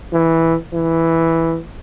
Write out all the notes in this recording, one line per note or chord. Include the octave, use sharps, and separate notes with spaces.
E3
E3